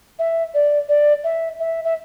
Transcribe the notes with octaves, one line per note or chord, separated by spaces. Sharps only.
E5
D5
D5
E5
E5
E5